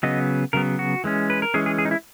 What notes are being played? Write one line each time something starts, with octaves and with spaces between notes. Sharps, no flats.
C#3 F#3 B3 D#5
C#3 F#3 B3 A#4
F#4
E3 G#3 C#4
B4
A#4
E3 G#3 C#4 G#4
G#4
G#4
D#4
E4